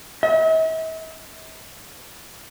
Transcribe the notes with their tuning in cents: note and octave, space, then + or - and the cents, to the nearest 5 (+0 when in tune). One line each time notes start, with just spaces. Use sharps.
E5 -45